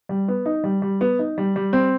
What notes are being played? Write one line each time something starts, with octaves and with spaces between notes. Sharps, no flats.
G3
B3
D#4
G3
G3
B3
D#4
G3
G3
C4